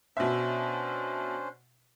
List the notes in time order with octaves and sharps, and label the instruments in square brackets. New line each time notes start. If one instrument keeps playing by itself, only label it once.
[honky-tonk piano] B2 E5 [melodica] C#4 D4 C5